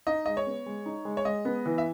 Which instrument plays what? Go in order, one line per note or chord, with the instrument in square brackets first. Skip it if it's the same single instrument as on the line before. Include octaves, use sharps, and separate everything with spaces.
[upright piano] D#4 [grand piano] D#5
[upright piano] G#3 [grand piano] D#5
[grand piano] C#5
[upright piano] B3
G#3
D#4
G#3
[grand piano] C#5
[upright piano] G#3 [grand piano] D#5
[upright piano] B3
E3
[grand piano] E5